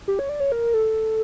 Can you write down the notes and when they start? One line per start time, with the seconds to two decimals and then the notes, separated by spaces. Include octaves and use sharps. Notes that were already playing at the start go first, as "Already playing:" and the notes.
0.08 G4
0.19 C#5
0.29 D5
0.40 C#5
0.52 A#4
0.74 A4